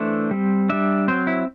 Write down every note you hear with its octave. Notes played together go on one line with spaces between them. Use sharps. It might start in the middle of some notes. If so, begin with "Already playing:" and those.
Already playing: E3 A3 D4 C5
G3 C4
G3 D4 E5
F#3 C4 C5
E4